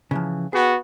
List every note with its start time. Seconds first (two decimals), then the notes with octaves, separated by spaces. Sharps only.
0.11 C#3 E3 F3
0.53 B3 F#4 G#4 G5